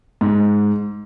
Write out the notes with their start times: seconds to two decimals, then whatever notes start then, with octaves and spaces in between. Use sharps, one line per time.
0.21 G#2